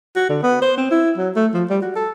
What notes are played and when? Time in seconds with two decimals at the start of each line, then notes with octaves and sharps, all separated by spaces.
0.16 F#4
0.29 D3
0.43 B3
0.62 C5
0.78 C4
0.91 E4
1.17 F#3
1.36 A3
1.54 F3
1.70 G3
1.82 F#4
1.96 A4